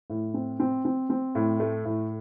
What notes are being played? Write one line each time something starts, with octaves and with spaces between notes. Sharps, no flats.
A2
C4
C4
C4
C4
A2
A3
A2